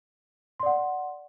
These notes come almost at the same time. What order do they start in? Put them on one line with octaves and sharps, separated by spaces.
C6 D5 F#5